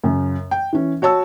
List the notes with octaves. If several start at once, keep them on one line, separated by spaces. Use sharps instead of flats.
F#2 C#3
G5
E3 C#4
F#4 C#5 A5 E6